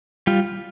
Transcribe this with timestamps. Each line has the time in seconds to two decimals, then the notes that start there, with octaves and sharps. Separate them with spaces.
0.27 G3 F4